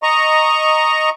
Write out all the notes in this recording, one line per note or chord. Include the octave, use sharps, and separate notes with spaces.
D#5 A#5 C#6